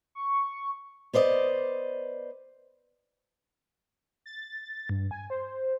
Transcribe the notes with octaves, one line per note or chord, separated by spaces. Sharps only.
C#6
B3 C5 D5 D#5
A6
G2
G#5
C5